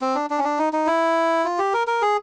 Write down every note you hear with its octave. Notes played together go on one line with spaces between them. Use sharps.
C4
D4
D4
C#4
D4
D#4
D#4
E4
F4
G4
A#4
A#4
G#4